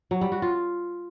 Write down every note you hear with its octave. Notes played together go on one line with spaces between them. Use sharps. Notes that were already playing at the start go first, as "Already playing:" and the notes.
F#3
G3
F#4
F4